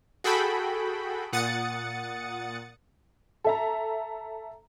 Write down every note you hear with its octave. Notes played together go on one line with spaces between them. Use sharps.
F#4 G#4 A4 G5 B5
A#2 F#5 D#6 A6 C#7
A4 E5 A#5